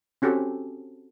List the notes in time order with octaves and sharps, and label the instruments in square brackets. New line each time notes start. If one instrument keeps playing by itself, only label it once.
[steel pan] C4 C#4 F#4 G4 A4